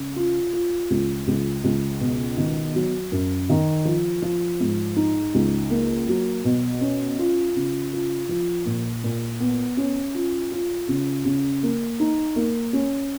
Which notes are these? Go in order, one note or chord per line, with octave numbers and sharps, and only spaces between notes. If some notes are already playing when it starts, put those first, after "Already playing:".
Already playing: C#3
F4
F4
C#2
C#2
C#2
B2
D#3
F#3
F#2
D#3
F3
F3
G#2
D#4
C#2
A#3
F#3
B2
C#4
F4
C#3
F4
F3
A#2
A#2
B3
C#4
F4
F4
C#3
C#3
A#3
D#4
A#3
C#4